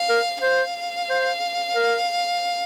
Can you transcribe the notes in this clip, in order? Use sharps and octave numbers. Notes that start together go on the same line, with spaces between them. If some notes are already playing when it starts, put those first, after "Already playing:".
Already playing: F5
A#4
C5 F5
C5
A#4